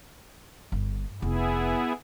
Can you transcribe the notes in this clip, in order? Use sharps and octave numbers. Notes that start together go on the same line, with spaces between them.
G1
F1 B3 E4 G#4